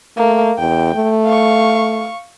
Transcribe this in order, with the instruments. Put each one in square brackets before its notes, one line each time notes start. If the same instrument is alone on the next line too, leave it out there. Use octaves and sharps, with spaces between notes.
[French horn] A3 [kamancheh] A#3
[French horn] E2 [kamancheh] G5
[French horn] A3
[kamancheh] F5 C#6